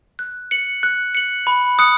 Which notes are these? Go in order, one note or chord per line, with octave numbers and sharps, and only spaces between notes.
F#6
C#7 F#7
F#6
C#7 F#7
B5
D#6 F#6 C#7